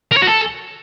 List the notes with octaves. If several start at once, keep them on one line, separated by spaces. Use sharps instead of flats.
A#4
C#5
F#4
A4